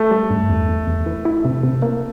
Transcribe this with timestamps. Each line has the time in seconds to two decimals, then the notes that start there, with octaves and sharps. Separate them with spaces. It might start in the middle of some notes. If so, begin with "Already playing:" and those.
Already playing: A3
0.11 G3
0.30 G2
0.49 E2
0.68 E2
0.87 E2
1.06 E3
1.25 E4
1.45 C3
1.63 C3
1.82 A#3